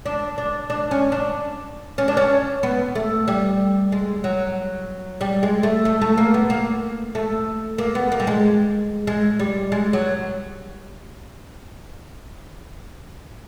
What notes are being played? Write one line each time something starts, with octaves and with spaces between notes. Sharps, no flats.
D4
D4
D4
C#4
D4
C#4
D4
C#4
B3
A3
G3
G#3
F#3
G3
G#3
A3
A3
A3
A#3
B3
A#3
A3
A#3
B3
A#3
G3
G#3
G#3
G3
G#3
F#3